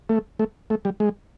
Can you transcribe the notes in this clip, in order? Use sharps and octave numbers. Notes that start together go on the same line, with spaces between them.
A3
A3
A3
G3
G#3